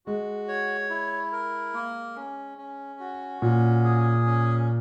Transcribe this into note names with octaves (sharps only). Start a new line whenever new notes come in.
G#3 F#4
C#5
E4
A#4
A#3
C#4
C#4
F#4
A#2 C#4
G#4
C#4